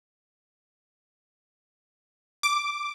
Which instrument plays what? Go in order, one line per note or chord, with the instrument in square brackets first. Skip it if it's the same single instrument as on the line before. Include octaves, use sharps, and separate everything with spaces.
[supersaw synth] D6